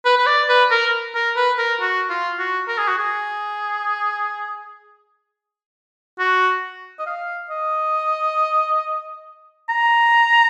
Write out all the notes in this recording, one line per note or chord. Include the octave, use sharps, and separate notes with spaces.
B4
B4
D5
B4
A#4
A#4
B4
A#4
F#4
F4
F#4
A#4
G#4
F#4
G#4
F#4
D#5
F5
D#5
A#5